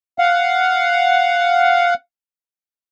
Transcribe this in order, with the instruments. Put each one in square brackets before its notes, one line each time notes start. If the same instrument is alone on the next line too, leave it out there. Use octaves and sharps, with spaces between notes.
[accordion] F5 F#5